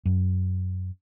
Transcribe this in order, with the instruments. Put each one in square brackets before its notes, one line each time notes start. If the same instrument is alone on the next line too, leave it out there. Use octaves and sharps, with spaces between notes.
[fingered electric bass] F#2